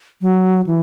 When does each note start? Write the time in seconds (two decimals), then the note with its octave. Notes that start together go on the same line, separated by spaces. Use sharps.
0.21 F#3
0.67 E3